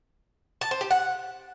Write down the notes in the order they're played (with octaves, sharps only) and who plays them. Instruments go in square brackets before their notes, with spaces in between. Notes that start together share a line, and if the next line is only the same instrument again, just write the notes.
[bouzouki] A5
C5
G4
F#5